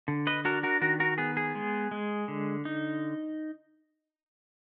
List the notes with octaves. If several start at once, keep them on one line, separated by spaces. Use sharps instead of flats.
D3
B4 D#5
D4 F#4 A#4
F#4 A#4
D#3 F#4 A#4
F#4 A#4
B3 G#4
G#4
G#3
G#3
D3
D#4